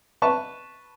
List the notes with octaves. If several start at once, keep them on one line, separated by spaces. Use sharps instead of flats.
B4 A5 C#6